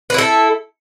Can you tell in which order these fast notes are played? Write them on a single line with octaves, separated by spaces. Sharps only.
B4 E4 A4